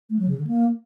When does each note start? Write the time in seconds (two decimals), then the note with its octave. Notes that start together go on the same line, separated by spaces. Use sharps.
0.10 A3
0.19 F#3
0.28 C#3
0.38 D3
0.47 A#3